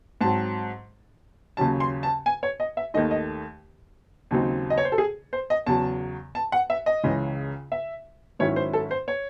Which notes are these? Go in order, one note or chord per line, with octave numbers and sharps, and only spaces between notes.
G#2 F#3 C4 A5
D#2 C#3 F#3 C#4 A5
C6
A5
G#5
C#5
D#5
E5
D#2 D#3 A3 D#4 D#5
D#5
D#2 C#3 F#3 C4 D#4
D#5
C#5
C5
A4
G#4
C5
D#5
E2 C#3 F#3 A5
A5
F#5
E5
D#5
C#2 C#3 E3 G#3
E5
G#2 D#3 F#3 C#4 E4 C#5
C5
A4
C5
C#5